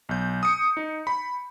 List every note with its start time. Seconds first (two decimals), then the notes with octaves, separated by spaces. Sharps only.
0.09 B1 G6
0.43 D#6 C#7
0.77 D#4
1.07 B5